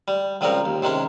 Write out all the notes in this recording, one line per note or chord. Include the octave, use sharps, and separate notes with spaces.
G3
C#2 F3 G3 C4 A#4 C#5
D#2
C3 D#3 G#3 C#4